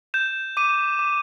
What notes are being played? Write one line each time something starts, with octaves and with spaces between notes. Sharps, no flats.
G6 E7
D6 D#7
D6